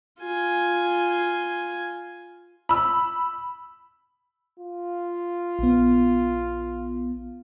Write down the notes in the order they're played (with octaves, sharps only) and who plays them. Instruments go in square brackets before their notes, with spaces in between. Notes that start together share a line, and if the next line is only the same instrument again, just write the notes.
[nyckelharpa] F4 G#5
[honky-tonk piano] B5 E6
[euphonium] F4
[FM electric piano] A#1 B3